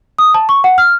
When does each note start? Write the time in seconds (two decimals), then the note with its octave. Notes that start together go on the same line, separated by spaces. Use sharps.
0.19 D#6
0.34 A5
0.49 C#6
0.64 F#5
0.78 F6